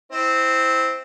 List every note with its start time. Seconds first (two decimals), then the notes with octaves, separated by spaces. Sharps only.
0.12 C4 E4